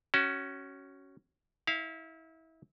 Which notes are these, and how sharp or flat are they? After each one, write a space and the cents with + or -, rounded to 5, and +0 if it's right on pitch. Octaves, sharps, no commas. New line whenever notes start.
C#4 +0 F#4 +25
E4 -30 F5 -5